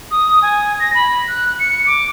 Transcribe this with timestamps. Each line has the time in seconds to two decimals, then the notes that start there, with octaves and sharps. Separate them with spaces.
0.11 D#6
0.42 G#5
0.79 A#6
0.94 B5
1.27 F#6
1.59 C#7
1.86 D6